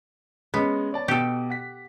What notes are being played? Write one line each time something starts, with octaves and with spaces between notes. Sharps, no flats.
G#3 B3 C#4 D#5
C#5 D5 A5
B2 G4 A4
F#5 B6